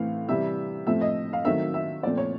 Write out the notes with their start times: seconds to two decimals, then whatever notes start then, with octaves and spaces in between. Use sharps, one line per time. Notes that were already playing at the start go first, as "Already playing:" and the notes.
Already playing: A2 E3 A3 C4 F5
0.29 C3 E3 G3 E5
0.87 A2 F3 A3 C4 E5
1.01 D#5
1.33 F5
1.45 D#3 F#3 A3 C4 E5
1.74 E5
2.03 A#2 F3 A3 C4 D5
2.17 C#5